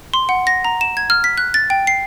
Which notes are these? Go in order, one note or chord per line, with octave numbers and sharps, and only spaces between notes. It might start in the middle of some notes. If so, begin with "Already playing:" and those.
C6
F#5
A#6
A#5
E7
G#6
F6
B6
F#6
A6
G5
C7